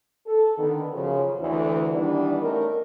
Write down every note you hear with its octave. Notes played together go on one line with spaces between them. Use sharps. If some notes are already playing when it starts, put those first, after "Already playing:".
A4
D3 D#3 B3
F#2 C#3 F3
D2 E3
D#3 E3 G3 B3 D4
A3 C#4 D#4 A#4